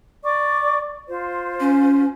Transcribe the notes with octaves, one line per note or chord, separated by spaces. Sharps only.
D5 C#6 D6
F4 C5
C#4